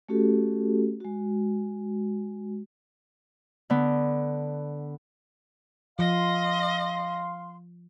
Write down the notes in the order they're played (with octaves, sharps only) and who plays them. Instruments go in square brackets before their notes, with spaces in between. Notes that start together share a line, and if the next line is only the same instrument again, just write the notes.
[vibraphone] A3 C#4 F#4 G4 A4
G#3 F#4
[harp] D3 B3
[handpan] F3 [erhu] D#5 [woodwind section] F5 C6